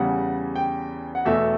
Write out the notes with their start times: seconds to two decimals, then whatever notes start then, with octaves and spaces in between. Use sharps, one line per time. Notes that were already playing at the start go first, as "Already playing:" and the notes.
Already playing: E2 C#3 G3 F#5
0.56 G5
1.15 F#5
1.25 E2 B2 A3 E5